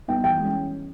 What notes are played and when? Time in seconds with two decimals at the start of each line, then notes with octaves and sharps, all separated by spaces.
0.08 G3 B3 D#4 G5
0.24 E3 G5
0.41 G#3 C#4